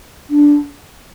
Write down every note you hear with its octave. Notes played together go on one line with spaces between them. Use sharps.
D4